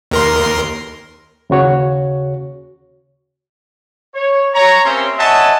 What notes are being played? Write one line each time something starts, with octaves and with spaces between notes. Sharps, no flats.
D#2 A#4 C6
D#2 C#3 F#4 C#5
C#5
C#5 A#5
A#3 C4 C#4 G4 E5 C6
C#5 D#5 E5 F#5 G#5 A5